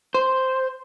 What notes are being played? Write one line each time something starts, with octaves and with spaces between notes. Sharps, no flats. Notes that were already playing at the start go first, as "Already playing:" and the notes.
C5